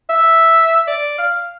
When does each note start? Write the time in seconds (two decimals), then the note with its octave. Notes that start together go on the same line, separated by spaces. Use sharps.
0.09 E5
0.87 D5
1.18 F5